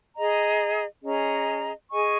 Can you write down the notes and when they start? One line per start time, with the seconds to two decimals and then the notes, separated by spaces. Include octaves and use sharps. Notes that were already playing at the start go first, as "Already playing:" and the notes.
0.15 G#4 D#5 A#5
1.02 C#4 G#4 D#5 A#5
1.89 G#4 D#5 G#5 C#6